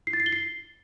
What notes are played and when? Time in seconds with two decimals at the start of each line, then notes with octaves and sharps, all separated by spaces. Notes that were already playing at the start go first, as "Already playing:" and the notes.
0.07 C7
0.13 A6
0.20 C7
0.26 G7
0.33 C7